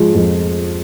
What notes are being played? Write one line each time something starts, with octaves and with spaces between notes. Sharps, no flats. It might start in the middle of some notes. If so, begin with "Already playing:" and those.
Already playing: F3 G#3
F2